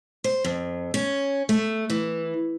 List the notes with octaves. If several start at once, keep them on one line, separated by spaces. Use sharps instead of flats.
C5
F2
C#4
A3
E3